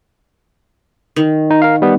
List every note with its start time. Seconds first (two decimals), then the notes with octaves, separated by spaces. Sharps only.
1.16 D#3
1.50 D#4
1.62 A#4 F5
1.82 G3 B3